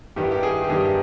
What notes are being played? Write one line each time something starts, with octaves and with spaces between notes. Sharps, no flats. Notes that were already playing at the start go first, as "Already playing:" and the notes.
G2 D#3 G3 B3 G4
E4
G4
G#4
G4
G2 D#3 G3 B3 G#4